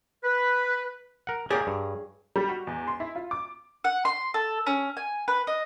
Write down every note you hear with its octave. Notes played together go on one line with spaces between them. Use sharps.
B4
A#4 F#5
A#3 G4 G#4 C#5 D5
G2
G3
F#4
E2
C6
E4
F4
D6
F#5
C6
A4
C#4
G#5
B4
D#5